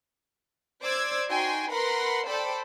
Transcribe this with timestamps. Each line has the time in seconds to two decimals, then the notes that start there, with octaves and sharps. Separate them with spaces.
0.81 C5 D5 D6 E6 G#6
1.29 D#4 F#4 G5 G#5 C6
1.69 A#4 B4 F#5 B5 C6
2.26 A4 C5 D5 G5 B5